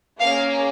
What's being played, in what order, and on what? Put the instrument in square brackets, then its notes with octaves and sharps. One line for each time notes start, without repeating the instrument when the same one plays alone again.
[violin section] A#3 C#4 G#4 F5